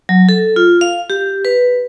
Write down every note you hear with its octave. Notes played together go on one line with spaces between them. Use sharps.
F#3
A4
F4
F5
G4
B4